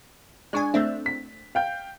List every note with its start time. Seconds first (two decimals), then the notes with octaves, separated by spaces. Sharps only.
0.53 G#3 D4 D5 G#5 C#6
0.74 A3 C4 D4 E5 E6
1.06 B6
1.55 F5 G5 G6